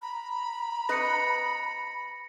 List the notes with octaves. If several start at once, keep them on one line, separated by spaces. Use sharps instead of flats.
A#5 B5
C4 B4 D#5 A#6 C#7